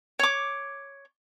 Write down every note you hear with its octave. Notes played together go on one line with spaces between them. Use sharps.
C#5 D6